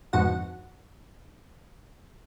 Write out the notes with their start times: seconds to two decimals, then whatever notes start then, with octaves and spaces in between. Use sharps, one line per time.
0.13 G1 F2 G#2 F#4 F#5